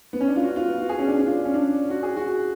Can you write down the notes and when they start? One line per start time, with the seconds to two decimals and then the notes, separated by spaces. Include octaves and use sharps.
0.13 B3
0.21 C#4
0.28 D4
0.36 F4
0.44 F#4
0.56 F4
0.68 B3
0.81 F#4
0.89 G#4
0.99 C#4
1.08 D4
1.18 D4
1.27 F4
1.45 C#4
1.54 D4
1.90 F#4
2.03 G#4
2.17 F#4